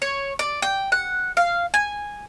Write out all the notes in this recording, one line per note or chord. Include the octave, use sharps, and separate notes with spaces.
C#5
D5
G5
F#5
F5
G#5